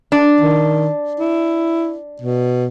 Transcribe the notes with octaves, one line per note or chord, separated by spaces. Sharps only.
D4
D#3
E4
B2